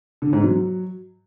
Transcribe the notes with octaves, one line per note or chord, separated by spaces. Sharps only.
D3
G#2
F#3